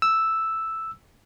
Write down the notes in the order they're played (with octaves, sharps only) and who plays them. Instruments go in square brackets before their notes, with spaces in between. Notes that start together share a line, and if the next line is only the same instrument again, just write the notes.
[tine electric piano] E6